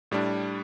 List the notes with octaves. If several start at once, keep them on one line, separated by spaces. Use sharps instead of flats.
A2 G3 D4